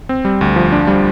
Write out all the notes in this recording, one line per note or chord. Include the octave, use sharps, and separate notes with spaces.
C4
G3
D2
F3
D4
G3